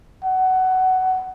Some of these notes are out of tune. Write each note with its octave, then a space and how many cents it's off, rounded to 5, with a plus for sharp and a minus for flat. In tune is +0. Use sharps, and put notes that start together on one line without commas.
F#5 +15